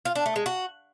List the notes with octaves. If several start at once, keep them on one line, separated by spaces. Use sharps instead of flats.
F4
D4
A3
G#3
F#4